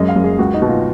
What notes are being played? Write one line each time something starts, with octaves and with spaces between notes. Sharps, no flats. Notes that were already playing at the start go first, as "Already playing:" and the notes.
Already playing: F#2 G#3 D#5
F5
F#2
G#4
C#2 F#4
D#4
B2
F4